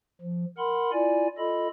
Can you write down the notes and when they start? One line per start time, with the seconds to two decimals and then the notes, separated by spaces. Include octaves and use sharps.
0.21 F3
0.58 A#4 F#5 B5 C6
0.93 E4 F4 D5 G#5
1.38 F4 A4 D#5 B5